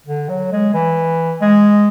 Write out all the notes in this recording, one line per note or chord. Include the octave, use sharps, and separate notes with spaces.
D3
F#3
G#3
E3
G#3